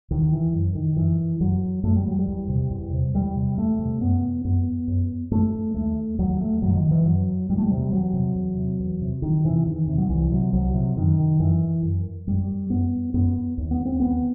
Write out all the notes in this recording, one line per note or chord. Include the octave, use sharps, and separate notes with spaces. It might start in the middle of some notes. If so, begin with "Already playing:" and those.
D#2 D#3
E3
F#2
D#3
F#2 E3
F#2 F#3
F#2 A3
G3
F#3
G3
E2
C3
E2
C3
E2 G3
C3
E2 A3
C3
F#2 B3
F#2 B3
F#2
F#2 A3
D#2 A3
D#2 F#3
A3
F#2 F#3
E3
D#3
E3
F#2 F#3
E2 G3
A3
C3 G3
E2 F#3
C3
E2
C3
E2
C3
E2 D#3
C3 E3
E2 D#3
C3
F#3
C2 E3
C3 F#3
C2 F#3
C3
F#2 D#3
F#2 E3
F#2
F#2 G3
F#2 B3
F#2 B3
D#2
B3
C4
D#2 B3